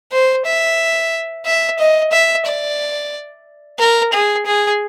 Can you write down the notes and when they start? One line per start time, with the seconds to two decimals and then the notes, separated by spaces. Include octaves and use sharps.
0.12 C5
0.45 E5
1.46 E5
1.79 D#5
2.12 E5
2.45 D5
3.79 A#4
4.13 G#4
4.46 G#4